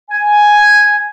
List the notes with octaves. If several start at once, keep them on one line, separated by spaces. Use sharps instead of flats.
G#5